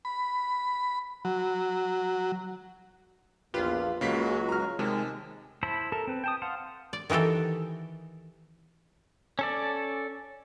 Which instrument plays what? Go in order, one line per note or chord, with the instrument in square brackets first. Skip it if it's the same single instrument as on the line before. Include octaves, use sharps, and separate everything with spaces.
[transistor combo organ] B5
F#3
[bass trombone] A#1 [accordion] E2 [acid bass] F4 [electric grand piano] G4 B4
[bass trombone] C#2 [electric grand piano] C#3 A#3 B6 [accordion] F#3 G#3 F#4
[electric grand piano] A#5 F6
[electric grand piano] C3 [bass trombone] D#3 [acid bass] G#3 [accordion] A5
[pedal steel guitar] E4 C5 A5 B5 E6
A4 A#4 A5
C4 B4
G5 A5 D#6
F5 F#5 A5 C6
[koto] D5
D#3 E3 F#4 G4 A4
[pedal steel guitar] C#4 A4 D5